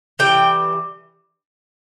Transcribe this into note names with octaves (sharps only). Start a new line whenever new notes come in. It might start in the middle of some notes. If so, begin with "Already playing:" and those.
E3 G3 G5